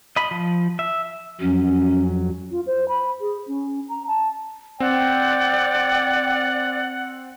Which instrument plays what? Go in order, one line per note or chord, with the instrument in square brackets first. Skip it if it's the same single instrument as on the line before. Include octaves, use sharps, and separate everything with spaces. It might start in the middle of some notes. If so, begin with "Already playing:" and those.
[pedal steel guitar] D#5 B5
F3
E5
[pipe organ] F2 F#3 [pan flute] C#4
[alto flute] F4
C5
B5
G#4
C#4
A#5
A5
[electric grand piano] C4 [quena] D5 [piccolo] F#5 [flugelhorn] G5